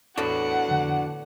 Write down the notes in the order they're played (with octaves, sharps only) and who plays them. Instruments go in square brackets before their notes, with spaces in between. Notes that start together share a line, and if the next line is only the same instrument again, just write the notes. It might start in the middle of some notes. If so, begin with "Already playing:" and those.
[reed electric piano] E2 [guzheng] A2 B3 [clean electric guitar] D4 F#4 [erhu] F#5
[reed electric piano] F2 D3